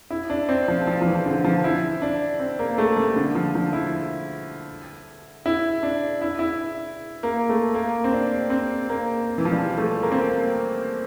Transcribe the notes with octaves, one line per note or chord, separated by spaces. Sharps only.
E4
D4
C4
F3
F3
F3
E3
D3
F3
E4
D4
C4
A#3
A3
G3
D3
F3
F3
E4
E4
D4
E4
E4
A#3
A3
A#3
C4
D4
C4
A#3
E3
F3
G3
A3
A#3
C4
A#3